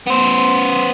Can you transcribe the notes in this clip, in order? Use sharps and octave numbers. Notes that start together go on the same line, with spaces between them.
B3 C5